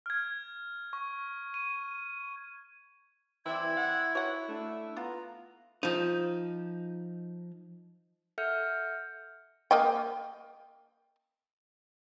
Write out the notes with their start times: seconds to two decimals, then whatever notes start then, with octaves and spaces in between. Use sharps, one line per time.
0.06 F6 G#6
0.93 C#6
1.54 D#7
3.46 E3 G3 C4 E4 G#6
3.77 F#5
4.15 F#4 C#5 F#5
4.48 A3 D4
4.96 B3 F4 A#5
5.83 F3 D#4
8.38 A4 E5 F#5 F6 G6 C#7
9.71 A#3 D#5 G5